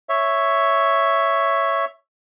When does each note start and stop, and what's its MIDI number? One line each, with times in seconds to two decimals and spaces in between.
0.09 1.85 73
0.09 1.85 76